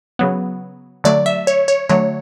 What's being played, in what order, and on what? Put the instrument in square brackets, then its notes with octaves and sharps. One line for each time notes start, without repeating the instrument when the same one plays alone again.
[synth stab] C#3 F#3 B3
D3 F#3 A3 D5
E5
C#5
C#5
D3 F#3 A3 C#5